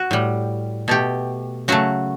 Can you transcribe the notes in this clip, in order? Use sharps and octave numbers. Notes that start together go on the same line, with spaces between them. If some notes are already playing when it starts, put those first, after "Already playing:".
Already playing: F#4
A2 G3
B2 A3 G4
C#3 F#3 A3 F#4